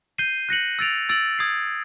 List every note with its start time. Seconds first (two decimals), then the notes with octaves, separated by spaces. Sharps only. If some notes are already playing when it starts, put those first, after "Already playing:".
0.18 G6 C7 D#7 G7
0.49 F#6 A#6 C#7 F#7
0.79 E6 A6 D7 F7
1.09 E6 A6 D7 F#7
1.39 D#6 G#6 C7